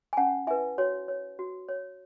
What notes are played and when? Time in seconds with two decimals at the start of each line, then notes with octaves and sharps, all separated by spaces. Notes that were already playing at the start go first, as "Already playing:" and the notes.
0.13 G#5
0.17 C#4 F#5 A5
0.47 E4 B4 E5 G#5
0.78 F#4 C#5
1.08 C#5
1.39 F#4
1.69 C#5